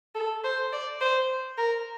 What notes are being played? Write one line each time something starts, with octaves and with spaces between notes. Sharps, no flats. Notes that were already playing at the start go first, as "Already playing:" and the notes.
A4
C5
D5
C5
A#4